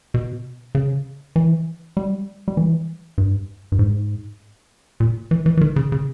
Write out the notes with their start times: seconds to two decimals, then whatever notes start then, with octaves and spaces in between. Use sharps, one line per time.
0.14 B2
0.75 C#3
1.36 E3
1.97 G3
2.48 G3
2.57 E3
3.18 G2
3.72 G2
3.79 G#2
5.00 A#2
5.31 E3
5.46 E3
5.57 E3
5.61 D#3
5.76 C#3
5.92 C#3